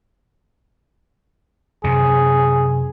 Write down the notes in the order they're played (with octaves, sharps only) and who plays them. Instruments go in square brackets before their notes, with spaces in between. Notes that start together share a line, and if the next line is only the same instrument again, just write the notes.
[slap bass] F#2 C3 [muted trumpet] G#4